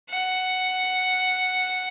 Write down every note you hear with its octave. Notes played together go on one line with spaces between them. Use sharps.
F#5